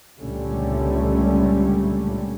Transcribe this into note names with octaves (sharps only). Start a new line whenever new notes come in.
C#2 A#2 D3 G3 A3 C#4